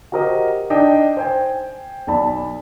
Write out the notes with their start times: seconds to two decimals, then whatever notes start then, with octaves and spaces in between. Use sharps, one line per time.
0.12 F#4 G4 A#4 C5 D#5
0.70 D4 D#4 D#5 G5
1.17 C5 G5 G#5
2.07 B1 D5 A5 B5